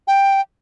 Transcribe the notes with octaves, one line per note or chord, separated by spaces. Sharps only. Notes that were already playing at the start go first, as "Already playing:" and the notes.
G5